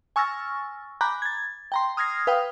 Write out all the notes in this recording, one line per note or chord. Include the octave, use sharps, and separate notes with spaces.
G#5 C#6 E6 F6 A6 A#6
G#5 A#5 B5 D6 F#6 G6
G#6 A6
G5 A#5 C6
D#6 F6 G#6 A#6 C7
B4 F5 G5 D#6 F6